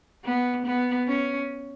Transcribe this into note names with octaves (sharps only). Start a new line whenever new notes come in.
B3
B3
C#4